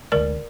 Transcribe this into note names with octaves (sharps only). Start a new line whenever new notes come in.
D2 D3 G#3 A#4 D5